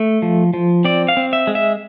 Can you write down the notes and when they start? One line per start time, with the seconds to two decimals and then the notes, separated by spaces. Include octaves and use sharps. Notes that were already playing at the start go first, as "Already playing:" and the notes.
Already playing: A3
0.22 F3
0.54 F3
0.85 C4 D5
1.08 F5
1.17 C4
1.33 E5
1.47 G#3
1.55 E5